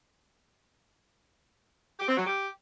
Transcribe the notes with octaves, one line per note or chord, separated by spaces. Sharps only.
G4
C4
F#3
G4